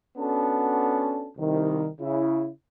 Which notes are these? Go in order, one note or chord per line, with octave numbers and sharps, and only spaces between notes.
B3 C#4 D4 F#4 A4 A5
C2 D#3
C#3 E4